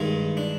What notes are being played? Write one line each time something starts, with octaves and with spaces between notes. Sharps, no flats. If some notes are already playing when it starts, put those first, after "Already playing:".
Already playing: G2 D#3 G#3 D#4
D4